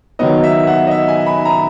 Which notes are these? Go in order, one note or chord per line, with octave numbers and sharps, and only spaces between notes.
D#3 F#3 B3 D#5
E5
F#5
D#5
E5
G#5
B5
A#5